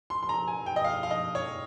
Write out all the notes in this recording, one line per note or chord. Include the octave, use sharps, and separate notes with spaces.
C6
C6
A#5
G#5
G5
D#5
F5
F5
D#5
C#5